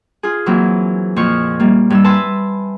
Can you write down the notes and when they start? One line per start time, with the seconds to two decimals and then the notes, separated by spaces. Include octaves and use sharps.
0.23 F4 G#4
0.46 E3 F#3 A#3 C4 E4
1.16 F2 A#2 F3 C#6 F6
1.60 G3 A#3
1.90 G2 G3 E6
2.04 B4 E5 G#5 A5 B5 C6